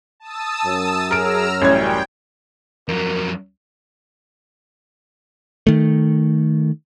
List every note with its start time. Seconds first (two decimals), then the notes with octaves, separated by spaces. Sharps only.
0.20 A5 D#6 E6
0.65 F#2
1.11 G#4 A#4 A#5 E6 F6 D7
1.62 A1 G3 C#4 G5 G#6
2.88 F2 F#3 A#4
5.67 D#3 A3